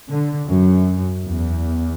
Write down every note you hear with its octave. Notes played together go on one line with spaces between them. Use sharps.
D3
F#2
E2